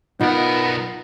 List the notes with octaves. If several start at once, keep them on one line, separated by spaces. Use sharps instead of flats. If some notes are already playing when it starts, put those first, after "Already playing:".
B1 B3 D#4 F4 A#4